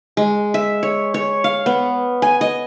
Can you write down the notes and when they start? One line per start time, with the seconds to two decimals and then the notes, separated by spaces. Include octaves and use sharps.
0.17 G#3
0.54 E5
0.83 C#5
1.14 C#5
1.44 F5
1.66 B3
2.22 G#5
2.41 D#5